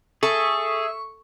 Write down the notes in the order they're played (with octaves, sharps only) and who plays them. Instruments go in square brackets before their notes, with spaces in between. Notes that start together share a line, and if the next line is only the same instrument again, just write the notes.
[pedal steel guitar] G#4 [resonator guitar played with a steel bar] A4 [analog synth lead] E5 [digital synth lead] C#6